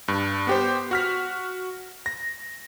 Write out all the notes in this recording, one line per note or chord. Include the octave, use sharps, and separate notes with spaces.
G2
B3 G4 C5
F#4 F6 B6
A#6